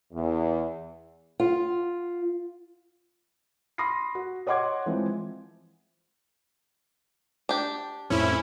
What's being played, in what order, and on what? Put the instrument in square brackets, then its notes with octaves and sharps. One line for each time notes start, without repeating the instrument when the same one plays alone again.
[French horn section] E2
[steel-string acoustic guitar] F4
[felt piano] B5 C6 D#6 A#6 C7
F#4
C#5 D#5 F#5 C6 D6 G#6
E3 F3 G#3 C4
[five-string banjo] D4 G4
[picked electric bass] F2 A2 F3 [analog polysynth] C#4 E4